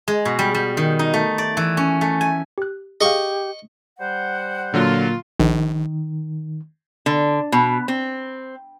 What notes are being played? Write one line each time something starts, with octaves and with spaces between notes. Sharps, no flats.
G#3
B2
G3
G3
D#3
D#4
A3
D5
E3
C#4
A3
G#5
G4 F#6
G4 G#4 D#5 F5 C#6
G3 C5 F#5
A#2 D3 F#3 F4
A#1 D#3
D3
B2
C4